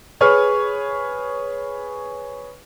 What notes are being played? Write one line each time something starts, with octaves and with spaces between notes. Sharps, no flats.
G#4 B4 C#5 C#6 F6